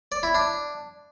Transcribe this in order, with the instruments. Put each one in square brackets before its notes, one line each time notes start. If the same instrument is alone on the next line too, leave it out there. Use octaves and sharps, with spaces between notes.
[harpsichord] D5
E4
D4